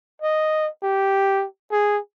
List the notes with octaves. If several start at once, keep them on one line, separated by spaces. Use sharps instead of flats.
D#5
G4
G#4